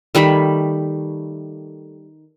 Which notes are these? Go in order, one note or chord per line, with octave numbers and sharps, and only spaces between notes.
D#3 G3 A3 B5